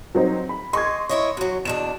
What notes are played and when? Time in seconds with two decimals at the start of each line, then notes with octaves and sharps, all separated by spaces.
0.15 F#3 C4 D#4
0.49 B5
0.73 D#5 C6 C#6 G#6
1.09 E4 C#5 D#5
1.37 F#2 F#3
1.65 E2 B2 D4 E7